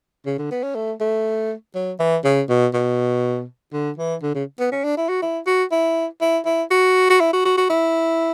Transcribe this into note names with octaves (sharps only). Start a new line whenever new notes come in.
C#3
D3
B3
C#4
A3
A3
F#3
E3
C#3
B2
B2
D3
E3
D3
C#3
B3
C#4
D4
E4
F#4
E4
F#4
E4
E4
E4
F#4
F#4
E4
F#4
F#4
F#4
E4